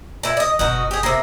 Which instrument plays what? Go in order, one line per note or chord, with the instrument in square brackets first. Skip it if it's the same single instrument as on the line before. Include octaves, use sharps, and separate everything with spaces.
[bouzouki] A#2 E4
D5 D#5
[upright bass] F#1 [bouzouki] B2 D#4 F#4
[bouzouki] G4 G#4
C3 A#3